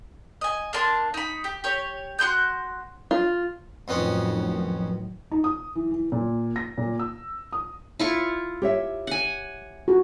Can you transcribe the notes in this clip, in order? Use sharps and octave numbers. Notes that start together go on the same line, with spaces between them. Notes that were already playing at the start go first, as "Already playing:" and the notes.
D#5 G#5
A#3 D4 A5 C6
D#4 B5
G4
G4 C#5
F#4 C6 F#6 G6
F4
F2 A2 D#3 F#3 B3 C#4
D#4
D#6
E3
E3
A#2
A#6
A#2
E6
D#6
E4 F4 C#6
G4 C#5 E5
F#5 G#5
F#4